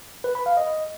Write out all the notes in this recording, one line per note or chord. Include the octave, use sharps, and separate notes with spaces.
B4
B5
F5
D#5